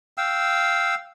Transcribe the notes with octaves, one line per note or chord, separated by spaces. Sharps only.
F5 G5 E6